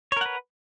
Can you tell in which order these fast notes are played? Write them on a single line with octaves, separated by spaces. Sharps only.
C#5 A#4 F#5 B4